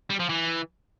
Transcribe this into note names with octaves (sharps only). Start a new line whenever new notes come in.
G3
F3
E3